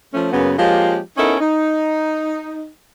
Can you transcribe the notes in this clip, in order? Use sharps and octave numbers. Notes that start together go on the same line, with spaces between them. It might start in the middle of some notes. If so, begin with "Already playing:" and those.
F3 A3 C#4
F#2 C#3 A#3 B3
F3 G#3 A#3 C#4 F4 G4
B3 C#4 D#4 E4 A4 A#4
D#4